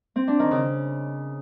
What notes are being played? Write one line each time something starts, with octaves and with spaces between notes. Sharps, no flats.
C4
D4
D#3
C#3